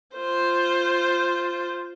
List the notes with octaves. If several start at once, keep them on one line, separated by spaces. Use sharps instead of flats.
F4 C5